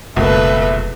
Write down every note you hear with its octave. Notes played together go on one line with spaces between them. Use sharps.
F1 C#2 B2 F#3 A#3 A4 B4 E5